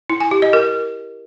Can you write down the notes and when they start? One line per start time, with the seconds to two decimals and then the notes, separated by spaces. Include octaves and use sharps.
0.10 E4
0.20 G#5
0.31 G4
0.42 D#5
0.53 A#4